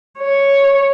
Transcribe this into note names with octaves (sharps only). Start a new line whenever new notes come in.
C#5